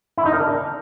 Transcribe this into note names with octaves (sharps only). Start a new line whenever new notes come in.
E4
D#4
A#4
D4